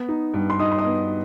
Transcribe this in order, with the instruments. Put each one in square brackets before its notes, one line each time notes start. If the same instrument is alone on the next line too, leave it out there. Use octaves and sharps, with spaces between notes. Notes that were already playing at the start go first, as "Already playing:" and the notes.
Already playing: [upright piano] B3
D#4
G2
C6
D#4 D#5 D#6
C6
D#5 D#6
B3